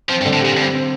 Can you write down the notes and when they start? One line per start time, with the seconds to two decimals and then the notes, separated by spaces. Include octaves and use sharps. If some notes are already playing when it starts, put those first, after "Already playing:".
0.09 F3 C4
0.21 G2
0.25 D3
0.33 A2
0.41 A#2 G4
0.57 G2 C4
0.73 C4